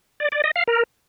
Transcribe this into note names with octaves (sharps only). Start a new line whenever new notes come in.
D5
D5
D#5
F5
A#4